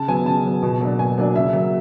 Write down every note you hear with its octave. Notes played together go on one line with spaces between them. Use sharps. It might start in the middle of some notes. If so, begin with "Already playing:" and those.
Already playing: C#3 A5
F#3 B3 G#5
C#3 A5
F#3 B3
B2
F#3 A#3 D4
B2 G#5
F#3 A#3 D4
C#3 E5
F#3 A#3